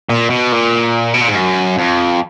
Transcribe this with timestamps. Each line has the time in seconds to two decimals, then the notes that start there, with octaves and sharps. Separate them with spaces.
0.09 A#2
0.30 B2
0.52 A#2
1.14 B2
1.21 A#2
1.28 G#2
1.35 F#2
1.78 F2